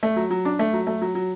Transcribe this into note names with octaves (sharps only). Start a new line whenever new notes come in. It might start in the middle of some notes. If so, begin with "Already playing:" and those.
A3
F#3
F#3
D4
A3
F#3
A3
F#3
F#3